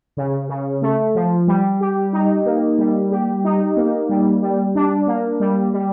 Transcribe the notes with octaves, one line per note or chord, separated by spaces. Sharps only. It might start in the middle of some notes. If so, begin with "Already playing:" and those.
C#3
C#3
A3
F3
G3
G4
D#4
A#3
G3
G4
D#4
A#3
G3
G3
D4
A#3
G3
G3